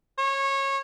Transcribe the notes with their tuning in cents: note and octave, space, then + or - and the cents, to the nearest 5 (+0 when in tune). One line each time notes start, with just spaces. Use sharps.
C#5 -20